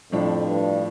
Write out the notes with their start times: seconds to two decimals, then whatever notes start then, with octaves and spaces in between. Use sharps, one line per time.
0.12 F2 A2 F3 D4
0.47 G2